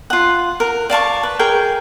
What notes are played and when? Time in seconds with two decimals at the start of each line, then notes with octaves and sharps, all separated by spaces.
0.10 F4 F#5
0.60 A#4
0.90 D5 F5 A5 C#6
1.23 B4
1.39 G#4 A#4 G5